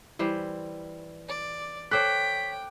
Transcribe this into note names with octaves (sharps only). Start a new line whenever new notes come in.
E3 G3 C5
D5
A4 C5 C#5 G5 D6 F#6 B6